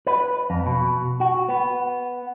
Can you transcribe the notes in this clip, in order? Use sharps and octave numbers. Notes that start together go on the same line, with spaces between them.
B4
F2
B2
F#4
B3